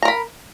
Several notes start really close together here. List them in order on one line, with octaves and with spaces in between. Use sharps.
A#5 A#4 B5